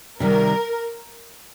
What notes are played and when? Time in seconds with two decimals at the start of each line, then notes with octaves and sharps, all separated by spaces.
0.20 C3 D#3 G3 A#4